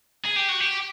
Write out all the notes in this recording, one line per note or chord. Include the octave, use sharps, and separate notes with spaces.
G#4
G4
F#4
G4